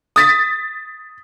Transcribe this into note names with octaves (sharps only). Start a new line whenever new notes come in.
D#6 A6 B6